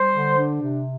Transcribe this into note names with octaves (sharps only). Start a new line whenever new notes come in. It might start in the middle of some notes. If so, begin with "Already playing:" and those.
Already playing: G3 C5
D3
D4
C3